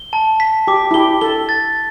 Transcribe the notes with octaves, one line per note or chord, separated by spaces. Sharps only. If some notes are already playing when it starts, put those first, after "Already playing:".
Already playing: G7
A5
B6
G4 D6
E4
G4 G7
A4 G7
A6